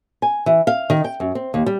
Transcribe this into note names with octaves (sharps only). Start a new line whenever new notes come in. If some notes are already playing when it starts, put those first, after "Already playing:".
G#5
E3
F5
D#3
G5
F#2
C4
D#2
G3